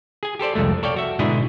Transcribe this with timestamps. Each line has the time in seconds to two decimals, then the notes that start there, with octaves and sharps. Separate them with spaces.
0.23 G#4 G#5
0.39 G4 A4 C5 D5
0.55 C2 F2 G#3 A3
0.83 A4 C#5 D5 F5 G5
0.96 F#4 E5
1.19 G#2 B2 D3 E4 G#4 D#5